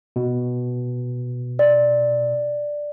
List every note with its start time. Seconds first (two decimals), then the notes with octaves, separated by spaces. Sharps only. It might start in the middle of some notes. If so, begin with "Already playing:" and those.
0.16 B2
1.59 D5